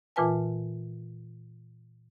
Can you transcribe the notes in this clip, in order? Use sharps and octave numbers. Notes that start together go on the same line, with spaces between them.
A#2 E3 F4 B4 G#5 A5